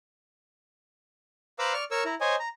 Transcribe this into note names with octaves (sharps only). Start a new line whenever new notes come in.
B4 C5 F5 A#5 D6 E6
D5 C#6 F6
A#4 C#5 C#6 E6
E4 A#5
C5 C#5 D#5 G#5
A#5